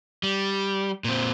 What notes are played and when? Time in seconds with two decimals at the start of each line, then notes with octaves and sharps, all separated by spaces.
0.23 G3
1.04 A#2 C4